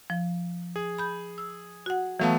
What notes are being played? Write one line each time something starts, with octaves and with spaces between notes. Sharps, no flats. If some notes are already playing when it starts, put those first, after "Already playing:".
F3
G#4
B5 G6
E6
F#4 F#5
E3 F#3 A3 B3 F5 A5